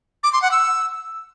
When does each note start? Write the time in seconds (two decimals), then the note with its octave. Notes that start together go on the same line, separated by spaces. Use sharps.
0.23 D6
0.33 C6
0.42 F#5
0.51 E6